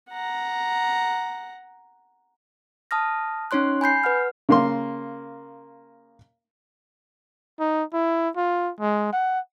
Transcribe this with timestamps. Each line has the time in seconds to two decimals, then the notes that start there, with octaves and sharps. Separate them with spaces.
0.10 F#5 A#5
2.91 A5 D#6 F6 A#6
3.51 C#4 D#4 C#5 C6 F#6
3.81 G#5 B5 G6 C7
4.04 B4 F#5 F6
4.49 C#3 A#3 C6
7.60 D#4
7.93 E4
8.37 F4
8.80 G#3
9.13 F#5